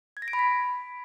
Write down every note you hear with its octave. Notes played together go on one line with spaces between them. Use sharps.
G#6
A#6
D7
B5
B6